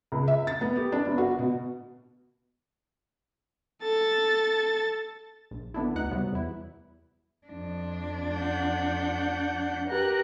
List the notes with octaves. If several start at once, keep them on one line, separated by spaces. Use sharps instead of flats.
C#2
E5
A6
B3
G4
D4
G1
F#4
B2
A4 A6
A#1
D3 B3 D4 E4
D2 B3 D#4 F#5 F#6
C3 F#3 G3 B3
E2 E4
F2 D4
F#5 G6
G4 A#4 B4 F#6